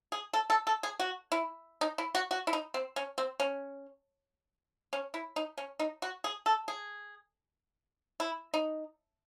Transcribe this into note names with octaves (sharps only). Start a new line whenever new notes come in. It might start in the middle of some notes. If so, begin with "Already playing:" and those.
G#4
A4
A4
A4
G#4
F#4
E4
D#4
E4
F#4
F#4
E4
D#4
C4
C#4
C4
C#4
C#4
E4
D#4
C#4
D#4
F#4
G#4
A4
G#4
E4
D#4